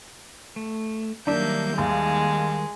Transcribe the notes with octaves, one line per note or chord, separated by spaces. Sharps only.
A3
D#3 F#3 G3 A#3 D4 E5 G6
D#2 G#3